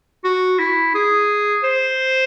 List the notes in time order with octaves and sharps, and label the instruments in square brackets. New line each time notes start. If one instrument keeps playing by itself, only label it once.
[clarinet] F#4
E4
G#4
C5